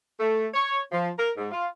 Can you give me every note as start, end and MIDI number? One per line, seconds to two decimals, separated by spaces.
0.19 0.47 57
0.54 0.81 73
0.92 1.09 53
1.18 1.31 70
1.37 1.51 44
1.52 1.67 65